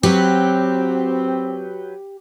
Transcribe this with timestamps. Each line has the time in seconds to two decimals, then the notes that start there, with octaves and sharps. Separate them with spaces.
0.03 F#3 C4 G4 B4 G6